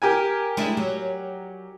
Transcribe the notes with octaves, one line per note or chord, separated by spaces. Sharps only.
G4 A#4 G#5
G#3 D4 E4
F#3